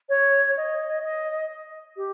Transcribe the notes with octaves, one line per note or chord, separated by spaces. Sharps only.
C#5
D#5
D#5
G4